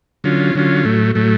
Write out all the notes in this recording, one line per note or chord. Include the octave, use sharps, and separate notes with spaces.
D3 F#3 C#4 F4
D3 F#3 C#4 F4
A2 F#3 A3
A2 F#3 A3